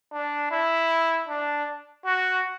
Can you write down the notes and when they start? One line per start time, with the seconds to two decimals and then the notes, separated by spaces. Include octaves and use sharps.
0.13 D4
0.51 E4
1.29 D4
2.06 F#4